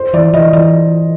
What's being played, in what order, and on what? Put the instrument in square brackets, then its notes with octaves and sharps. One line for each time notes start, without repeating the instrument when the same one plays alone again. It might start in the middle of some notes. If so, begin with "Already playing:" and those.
Already playing: [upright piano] C5
[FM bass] E3 [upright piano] D5
[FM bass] E3 [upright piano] D#5
[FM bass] E3 [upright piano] D5